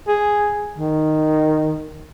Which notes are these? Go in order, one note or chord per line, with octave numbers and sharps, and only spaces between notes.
G#4
D#3